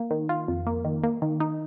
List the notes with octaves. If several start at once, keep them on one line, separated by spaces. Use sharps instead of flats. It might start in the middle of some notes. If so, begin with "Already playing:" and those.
Already playing: A#3
D#3
F4
F2
A#3
D#3
A#3
D#3
D#4